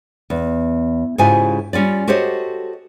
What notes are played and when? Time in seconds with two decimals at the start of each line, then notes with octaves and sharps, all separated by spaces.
0.30 E2
1.18 G#2 C#3 E4 F4 G4 G#5
1.73 G3 C#4 F4 D5
2.07 F#4 G4 A4 C5 C#5 D#5